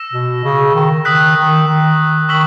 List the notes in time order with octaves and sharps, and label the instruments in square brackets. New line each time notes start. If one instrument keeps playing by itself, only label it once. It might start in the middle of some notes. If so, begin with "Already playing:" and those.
Already playing: [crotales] E6 A#6 E7
[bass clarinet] B2
C#3
D#3
[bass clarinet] D#3 [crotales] D#6 F#6 B6
[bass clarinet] D#3
D#3
[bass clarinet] D#3 [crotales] C#6 E6 B6 F#7